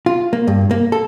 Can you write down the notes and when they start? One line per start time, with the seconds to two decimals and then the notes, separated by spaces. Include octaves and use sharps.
0.06 F4
0.33 A#3
0.47 G2
0.71 A#3
0.92 A4